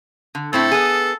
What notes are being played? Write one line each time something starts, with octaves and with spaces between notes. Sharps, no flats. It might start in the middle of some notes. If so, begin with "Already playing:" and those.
D3
A2 C4 E4 A4
B3 G#4